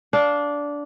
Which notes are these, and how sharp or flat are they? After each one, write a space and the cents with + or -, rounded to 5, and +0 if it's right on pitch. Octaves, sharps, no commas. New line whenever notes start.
D4 -15 F5 +0